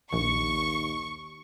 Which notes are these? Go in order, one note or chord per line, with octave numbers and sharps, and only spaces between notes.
A#1 D#2 C#6